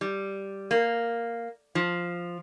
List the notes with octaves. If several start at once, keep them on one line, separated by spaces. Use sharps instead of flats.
G3
A#3
F3